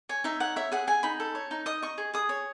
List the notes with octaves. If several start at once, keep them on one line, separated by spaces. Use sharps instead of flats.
C#5 G#5
D#4 E5
C#5 F#5
C#5 E5
G#4 F#5
G#4 G#5
D#4 B5
A4
C#5
D#4
D#5 D#6
D#5 C#6
G#4
G#4 D#6
C#5